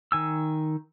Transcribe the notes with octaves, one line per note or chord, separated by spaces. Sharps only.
D#3 G#5 E6